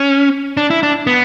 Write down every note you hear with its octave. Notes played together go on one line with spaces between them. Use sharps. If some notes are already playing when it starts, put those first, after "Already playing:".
Already playing: C#4
D4
E4
D4
B3